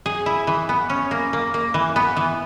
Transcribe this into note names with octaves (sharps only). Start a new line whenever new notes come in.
G#4
E4
E3
B3
C#4
A#3
A#3
A#3
E3
B3
E3